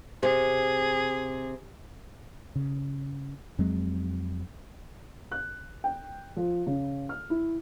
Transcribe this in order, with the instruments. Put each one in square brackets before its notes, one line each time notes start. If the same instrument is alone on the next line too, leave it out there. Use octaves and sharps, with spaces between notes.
[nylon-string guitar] C3 [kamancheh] G#4
[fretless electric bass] C#3
F2 F#3 G#3 C4
[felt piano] F#6
G5
F3
C#3
F6
E4